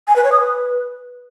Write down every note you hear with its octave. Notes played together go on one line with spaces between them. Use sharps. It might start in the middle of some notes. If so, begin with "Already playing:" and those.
G#5
B4
C#5
D#6
B4